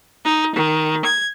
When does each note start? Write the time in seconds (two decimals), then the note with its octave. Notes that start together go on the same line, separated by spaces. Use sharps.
0.24 D#4
0.55 D#3
1.04 G#6